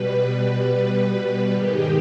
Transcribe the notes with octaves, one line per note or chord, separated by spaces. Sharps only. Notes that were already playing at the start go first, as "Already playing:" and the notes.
Already playing: B2 G3 B4
B4
G#2 D#3 G#3 G4